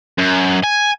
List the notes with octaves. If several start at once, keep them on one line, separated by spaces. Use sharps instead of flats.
F#2
G#5